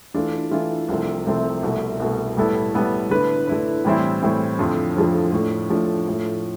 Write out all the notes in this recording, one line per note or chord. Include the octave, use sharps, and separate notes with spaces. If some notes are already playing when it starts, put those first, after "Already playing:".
E3 A3 D4 F4
E3 A3 D4 F4
C2 C3 F3 A3 C4
C2 C3 F3 A3 C4
C2 B2 A3
C2 B2 A3
A2 G3 B3 E4 A4
A2 G3 B3 E4 A4
D3 A3 E4 B4
D3 A3 E4 B4
A2 E3 G3 C4 E4
A2 E3 G3 C4 E4
F2 D3 F3 A3 C4
F2 D3 F3 A3 C4
A2 F3 A3 D4
A2 F3 A3 D4
A2 F3 A3